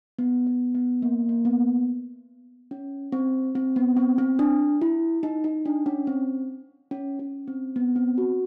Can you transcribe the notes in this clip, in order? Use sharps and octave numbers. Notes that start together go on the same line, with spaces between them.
B3
B3
B3
A#3
A#3
B3
C#4
C4
C4
B3
C4
C4
D4
E4
D#4
D#4
D4
C#4
C4
C#4
C#4
C4
B3
C4
F#4